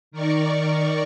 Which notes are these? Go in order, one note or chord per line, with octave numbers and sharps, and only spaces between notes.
D#3 A#4 D5 C#6